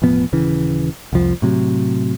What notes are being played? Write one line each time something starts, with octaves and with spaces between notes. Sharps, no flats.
E1 A2 F3 B3
D#1 C#3 E3
C2 F2 F3
A2 C3 F#3